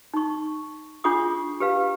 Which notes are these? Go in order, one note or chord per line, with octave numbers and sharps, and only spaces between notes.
D#4 C#6
D4 F4 G#4 F#5 C#6 D#6
G4 B4 F5